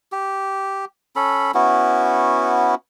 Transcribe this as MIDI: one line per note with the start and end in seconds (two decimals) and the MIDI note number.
0.12 0.85 67
1.16 1.51 61
1.16 1.51 69
1.16 1.51 83
1.54 2.75 59
1.54 2.75 61
1.54 2.75 64
1.54 2.75 66